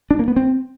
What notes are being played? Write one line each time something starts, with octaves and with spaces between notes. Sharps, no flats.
D4
A#3
B3
C4